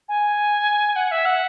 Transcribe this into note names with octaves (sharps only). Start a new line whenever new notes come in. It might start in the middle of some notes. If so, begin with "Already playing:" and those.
G#5
F#5
E5
F#5